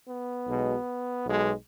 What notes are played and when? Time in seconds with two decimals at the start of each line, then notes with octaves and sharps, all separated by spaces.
0.09 B3
0.47 B1 B2 G#3
1.25 B1 B2 G#3